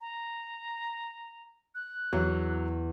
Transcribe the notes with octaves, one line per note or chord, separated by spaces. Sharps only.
A#5
F#6
E2 F#3